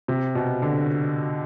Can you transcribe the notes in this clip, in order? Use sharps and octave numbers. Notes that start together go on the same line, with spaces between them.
C3
B2
D3